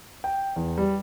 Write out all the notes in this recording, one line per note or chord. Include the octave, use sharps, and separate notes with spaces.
G5
E2
G3